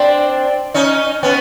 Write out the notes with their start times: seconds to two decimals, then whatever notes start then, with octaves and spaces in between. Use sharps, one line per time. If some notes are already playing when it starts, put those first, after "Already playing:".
Already playing: C4 D4
0.74 C#4 D#4
1.23 B3 C#4